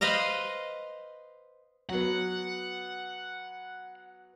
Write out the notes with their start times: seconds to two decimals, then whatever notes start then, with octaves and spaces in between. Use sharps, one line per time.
0.01 B4 C5 D#5 F5 A#5
1.89 F#3 B3 F#5